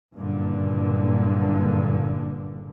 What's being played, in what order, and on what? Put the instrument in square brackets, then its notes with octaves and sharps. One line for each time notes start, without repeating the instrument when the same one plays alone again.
[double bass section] F#1 G2 A#2 D3